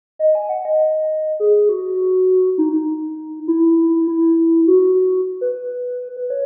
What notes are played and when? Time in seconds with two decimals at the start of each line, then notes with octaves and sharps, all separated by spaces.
0.19 D#5
0.35 G#5
0.49 F#5
0.65 D#5
1.40 G#4
1.69 F#4
2.58 D#4
2.73 D#4
3.48 E4
4.07 E4
4.67 F#4
5.41 B4
6.17 B4
6.30 C#5